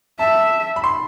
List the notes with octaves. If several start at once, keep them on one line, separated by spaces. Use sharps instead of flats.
E5 A5
B5
C6